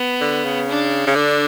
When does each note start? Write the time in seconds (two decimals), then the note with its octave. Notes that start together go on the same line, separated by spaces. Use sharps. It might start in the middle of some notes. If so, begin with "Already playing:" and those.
Already playing: B3
0.21 D3
0.44 C#3
0.69 D4
1.07 C#3
1.15 D3 D4